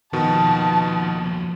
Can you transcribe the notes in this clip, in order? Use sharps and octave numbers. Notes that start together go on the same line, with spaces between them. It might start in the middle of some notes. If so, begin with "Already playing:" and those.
D#2 B2 D#3 F3 A5